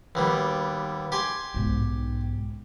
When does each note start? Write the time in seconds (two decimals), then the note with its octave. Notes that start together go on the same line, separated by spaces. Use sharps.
0.15 D#2 B2 G3
1.12 G4 G#5 C6
1.54 B1 G#2